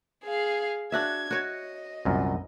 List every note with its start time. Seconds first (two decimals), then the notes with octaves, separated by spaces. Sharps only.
0.24 G#4 F5
0.92 D4 F#4 E5 G#6
1.31 F#4 C#5 D#5
2.05 C2 F#2 A#2